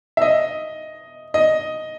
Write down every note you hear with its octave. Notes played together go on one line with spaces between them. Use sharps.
E5
D#5
D#5